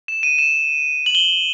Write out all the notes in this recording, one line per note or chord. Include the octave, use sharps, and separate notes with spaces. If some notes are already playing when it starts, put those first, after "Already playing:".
E7
D#7
E7
F#7
G7